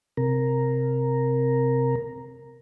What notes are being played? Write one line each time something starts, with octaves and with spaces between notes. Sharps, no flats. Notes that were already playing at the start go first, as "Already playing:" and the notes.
C3 A#4